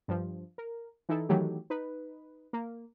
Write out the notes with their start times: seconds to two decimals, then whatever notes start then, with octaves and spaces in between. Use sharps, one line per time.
0.08 G2 F3
0.58 A#4
1.09 E3 D#4 E4 A4
1.29 D#3 E3 F#3 A3 G4
1.70 D#4 B4
2.53 A#3